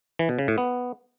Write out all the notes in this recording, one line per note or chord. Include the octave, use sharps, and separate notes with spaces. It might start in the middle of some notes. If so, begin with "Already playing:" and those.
E3
B2
C#3
A2
B3